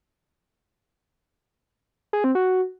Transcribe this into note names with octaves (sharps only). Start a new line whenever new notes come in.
G#4
C4
F#4